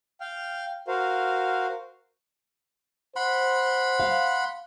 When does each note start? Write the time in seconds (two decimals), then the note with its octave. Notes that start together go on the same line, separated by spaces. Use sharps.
0.21 F5 G5 F6
0.88 F#4 A#4 C5 F5
3.16 C5 F#5 B5 C6
4.00 F5